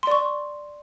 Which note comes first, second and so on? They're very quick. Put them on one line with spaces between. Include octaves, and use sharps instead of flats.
C6 D5 C#6